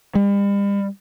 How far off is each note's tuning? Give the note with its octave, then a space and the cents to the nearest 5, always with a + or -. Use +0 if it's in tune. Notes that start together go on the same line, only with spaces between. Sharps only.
G3 +40